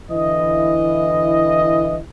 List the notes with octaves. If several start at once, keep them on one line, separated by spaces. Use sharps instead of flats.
D3 E3 E4 D#5